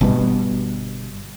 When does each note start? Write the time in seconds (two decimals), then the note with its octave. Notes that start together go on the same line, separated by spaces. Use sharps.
0.01 G1 G2 B2